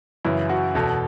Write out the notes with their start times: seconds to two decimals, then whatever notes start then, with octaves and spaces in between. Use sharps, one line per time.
0.25 F#2 C#3 E3 E4
0.49 F#4
0.75 E2 B2 A4